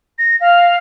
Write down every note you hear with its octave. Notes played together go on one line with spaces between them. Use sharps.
A#6
F5